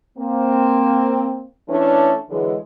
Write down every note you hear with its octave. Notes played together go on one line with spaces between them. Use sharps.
A#3 C4
E3 A3 C#4 D4
D3 E3 F#3 G#3